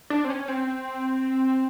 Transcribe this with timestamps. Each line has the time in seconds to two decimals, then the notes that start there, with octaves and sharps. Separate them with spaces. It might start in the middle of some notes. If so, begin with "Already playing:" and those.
0.10 D4
0.24 C4
0.30 C#4
0.48 C4